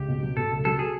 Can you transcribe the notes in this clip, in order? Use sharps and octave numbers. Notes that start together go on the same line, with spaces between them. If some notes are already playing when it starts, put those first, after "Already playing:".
Already playing: C#2 G4
B2
F#3
B2 A4
C#2
F#3 A4
G#4